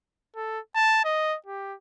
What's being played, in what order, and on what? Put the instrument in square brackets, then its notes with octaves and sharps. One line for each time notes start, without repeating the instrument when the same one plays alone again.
[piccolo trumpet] A4
A5
D#5
G4